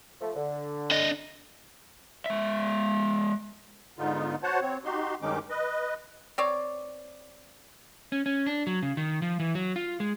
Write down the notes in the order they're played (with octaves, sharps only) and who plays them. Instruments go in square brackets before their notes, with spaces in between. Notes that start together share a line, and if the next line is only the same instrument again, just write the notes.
[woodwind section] F3 A3
D3
[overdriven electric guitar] D4 D#5
[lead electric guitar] G#3 E5
[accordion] G#2 D3 B3 D#4 F4
F#4 C5 C#5 F#5 A5
C4 C#5
D#4 F#4 G4 C6
G2 D#3 G#3 C#4 D#4 D6
B4 D#5
[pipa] C4 C#5 D5
[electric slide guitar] C#4
C#4
D4
F#3
C#3
D#3
F3
E3
F#3
F4
G#3